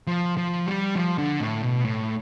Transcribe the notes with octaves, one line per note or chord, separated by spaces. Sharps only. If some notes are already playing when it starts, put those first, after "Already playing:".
F3
F3
G3
F3
D3
A2
B2
A2